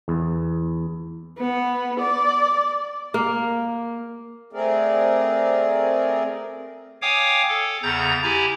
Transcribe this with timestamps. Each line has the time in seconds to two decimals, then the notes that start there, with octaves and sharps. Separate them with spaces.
0.08 E2
1.38 B3
2.00 D5
3.14 A#3
4.53 A3 C4 G#4 A#4 D5
7.02 C#5 F5 G5 G#5 D6 D#6
7.49 A4
7.83 E2 C#3 A#5 G6 A6
8.23 E4 G4 G#5 A#5